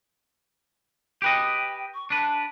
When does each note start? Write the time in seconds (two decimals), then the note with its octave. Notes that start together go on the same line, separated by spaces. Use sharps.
1.22 G4 B4 D#5 G5
1.94 C#6
2.10 D4 B4 A5